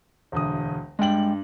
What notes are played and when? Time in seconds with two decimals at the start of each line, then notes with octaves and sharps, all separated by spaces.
0.32 E1 D2 D#6
0.99 G2 G#3 G5 F#7